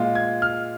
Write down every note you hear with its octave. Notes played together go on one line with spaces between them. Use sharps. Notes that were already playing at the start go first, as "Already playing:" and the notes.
Already playing: A#2 G#3 F4
G#6
F6